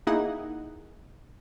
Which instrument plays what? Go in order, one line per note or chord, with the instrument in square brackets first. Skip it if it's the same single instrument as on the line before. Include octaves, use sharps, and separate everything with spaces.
[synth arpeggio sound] A#3 D#4 E4 G#4 F#5